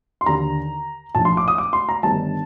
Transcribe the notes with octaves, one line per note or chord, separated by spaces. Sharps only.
C6
D#2 D3 A#5
A#1 A2 A5
C6
D6
D#6
D6
C6
A#5
G1 G2 D#3 A5